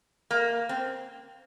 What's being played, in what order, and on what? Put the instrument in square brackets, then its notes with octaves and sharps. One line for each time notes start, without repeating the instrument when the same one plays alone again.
[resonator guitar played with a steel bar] A#3
C4